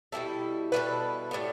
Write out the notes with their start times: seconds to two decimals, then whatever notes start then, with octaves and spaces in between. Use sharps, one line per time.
0.12 B2 G3 E4 A4
0.72 B2 G3 E4 A4 B4
1.31 A2 G3 B3